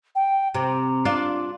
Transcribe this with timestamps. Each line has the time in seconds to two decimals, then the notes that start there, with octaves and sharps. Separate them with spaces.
0.15 G5
0.54 C3 A#5
1.05 D4 F4 D5